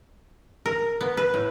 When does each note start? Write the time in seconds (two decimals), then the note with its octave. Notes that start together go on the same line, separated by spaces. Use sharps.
0.66 A#4
1.01 B3
1.17 B4
1.34 A2